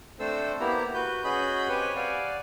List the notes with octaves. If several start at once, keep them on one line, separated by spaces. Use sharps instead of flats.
A3 C4 D4 A4 C5 E6
A#3 B3 E4 G4 A#5
F#4 B4 G6
C#4 F#4 G#4 D#5 B5 G6
C4 G4 B4 C#5 G#5
D5 F5 F#5 G#5